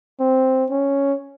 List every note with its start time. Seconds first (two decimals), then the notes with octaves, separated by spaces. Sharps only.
0.20 C4
0.70 C#4